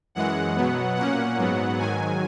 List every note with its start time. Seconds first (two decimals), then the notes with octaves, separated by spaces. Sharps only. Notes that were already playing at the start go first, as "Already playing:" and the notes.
0.15 F#2 E3 G#3 F#5
0.56 B2 F#3 B3
0.97 A#2 A#3 C#4 F#5
1.37 G#2 F#3 B3
1.78 G#2 D#3 F#3 G#5